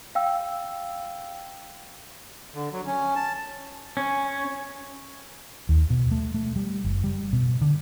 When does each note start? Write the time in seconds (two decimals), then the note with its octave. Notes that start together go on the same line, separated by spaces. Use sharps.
0.15 F5 G5 E6
2.55 D3
2.73 F#3
2.86 C#4
3.16 A5
3.97 C#4
5.69 D#2
5.90 B2
6.11 A3
6.34 A3
6.56 G3
6.84 F#1
7.04 G3
7.33 B2
7.61 D3